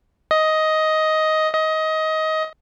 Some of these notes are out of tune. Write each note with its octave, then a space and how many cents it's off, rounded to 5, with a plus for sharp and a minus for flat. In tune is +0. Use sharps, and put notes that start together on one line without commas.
D#5 +10
D#5 +20